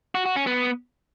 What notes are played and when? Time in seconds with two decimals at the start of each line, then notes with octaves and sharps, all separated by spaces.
0.15 F#4
0.25 F#4
0.36 C#4
0.47 B3